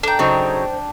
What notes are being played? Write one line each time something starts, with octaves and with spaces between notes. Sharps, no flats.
D4 A4 G5 A#5
C#3 F#3 D#4 C5